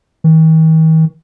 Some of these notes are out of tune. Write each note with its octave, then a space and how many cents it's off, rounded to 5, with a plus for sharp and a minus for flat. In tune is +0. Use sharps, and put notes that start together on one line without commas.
D#3 +45